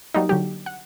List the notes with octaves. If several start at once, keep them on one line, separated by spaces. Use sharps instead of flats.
F#3 G3 A#3 D#4
D3 F#3 G4
F#5